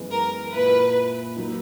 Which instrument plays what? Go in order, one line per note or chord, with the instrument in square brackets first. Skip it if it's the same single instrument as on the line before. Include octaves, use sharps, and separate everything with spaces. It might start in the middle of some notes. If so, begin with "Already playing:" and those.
Already playing: [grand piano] F#2 E3 G#3 B3
[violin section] A#4
[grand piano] A#2 A#3 E4 [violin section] B4
[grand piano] F#3 A#3 D#4